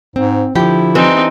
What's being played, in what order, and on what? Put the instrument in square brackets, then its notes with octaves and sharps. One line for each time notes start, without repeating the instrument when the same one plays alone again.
[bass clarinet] G#2 [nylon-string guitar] C4
[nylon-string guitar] D3 F3 [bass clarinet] E4 [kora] G4
[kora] E3 D4 [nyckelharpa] C4 D#4